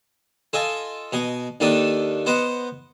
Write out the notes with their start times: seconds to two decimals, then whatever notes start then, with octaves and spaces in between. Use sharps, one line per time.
0.53 F4 A4 D#5 G#5
1.12 B2 D#5 G#5
1.60 D#2 D#3 D4 D#4 A4 D#6
2.26 B3 C5 D#5 F#5